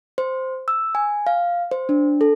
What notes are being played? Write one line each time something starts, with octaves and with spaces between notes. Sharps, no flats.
C5
E6
G#5
F5
C5
D4
A4